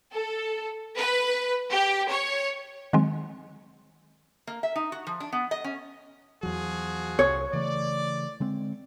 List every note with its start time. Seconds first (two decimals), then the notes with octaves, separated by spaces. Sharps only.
0.12 A4
0.97 B4
1.70 G4
2.09 C#5
2.93 D#3 F#3 G#3 C4
4.47 A#3
4.63 E5
4.76 D#4
4.92 F#4
5.07 F3
5.20 D4
5.32 B3
5.51 D#5
5.64 C#4
6.43 E2 F3 F#3 F#4 G#4
7.19 C2 C#5
7.53 C#3 E3 A3 D5
8.40 D3 G#3 C4